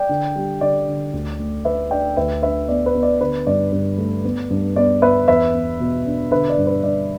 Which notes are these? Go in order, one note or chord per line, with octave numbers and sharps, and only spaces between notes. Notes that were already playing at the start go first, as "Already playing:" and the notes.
Already playing: D5 G5
D3
G3
D3 D5
D3
D2
A3
A3 B4 E5
D4 D5 G5
D2 B4 E5
D4 B4 E5
B3 D5
B4
B3
D5
D3 B4
G2 D5
G2
A3
B3
G2
B3 D5
B3 B4 E5
E2 B4 E5
B3
B2
D4
D3 B4 E5
D5
G2
B4
G2 D5